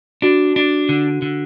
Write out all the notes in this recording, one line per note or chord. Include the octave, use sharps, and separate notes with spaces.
D4 F#4
D4
D3
D3